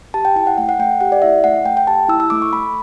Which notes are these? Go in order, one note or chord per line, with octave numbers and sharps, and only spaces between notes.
G4 A5
G5
E4 G5
F#5
A3 F#5
F#5
A3 G5
G4 F#5
D5
E4 E5
A3 F#5
A3 G5
G5
G4 A5
E4 E6
E6
A3 D6
C#6
A3 B5